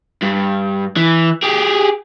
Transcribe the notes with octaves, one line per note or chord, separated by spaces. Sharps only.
G2
E3
G4 G#4